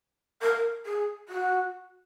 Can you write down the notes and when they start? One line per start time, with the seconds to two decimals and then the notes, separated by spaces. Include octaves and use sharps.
0.42 A#4
0.85 G#4
1.28 F#4